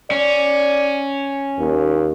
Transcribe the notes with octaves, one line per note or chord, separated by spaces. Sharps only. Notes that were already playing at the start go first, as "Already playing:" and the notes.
C#4 D5
D#2